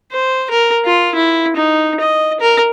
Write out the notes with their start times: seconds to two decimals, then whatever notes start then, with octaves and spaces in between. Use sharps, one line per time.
0.12 C5
0.50 A#4
0.85 F4
1.15 E4
1.56 D#4
2.00 D#5
2.40 A#4